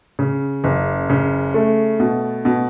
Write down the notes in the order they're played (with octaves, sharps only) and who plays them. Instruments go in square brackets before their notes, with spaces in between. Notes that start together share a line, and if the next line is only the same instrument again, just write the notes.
[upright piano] C#3
F#1
C#3
A3
B2
B2